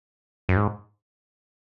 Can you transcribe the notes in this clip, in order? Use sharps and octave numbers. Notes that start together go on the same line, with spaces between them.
F#2
G#2